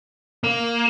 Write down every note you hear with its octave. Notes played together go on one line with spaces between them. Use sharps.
A#3